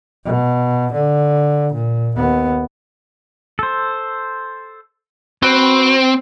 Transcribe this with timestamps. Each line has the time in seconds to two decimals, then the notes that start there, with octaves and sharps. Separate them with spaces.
0.25 B2
0.93 D3
1.74 A#2
2.17 D#2 B3
3.59 A4 C5
5.43 C4 F#4 B4